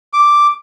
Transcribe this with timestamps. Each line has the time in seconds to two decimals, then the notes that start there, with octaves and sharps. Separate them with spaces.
0.13 D6